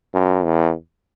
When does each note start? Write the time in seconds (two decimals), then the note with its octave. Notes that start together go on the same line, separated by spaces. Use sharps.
0.14 F#2
0.45 E2